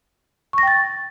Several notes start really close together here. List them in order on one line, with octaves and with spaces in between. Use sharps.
C#6 A#6 G5 A6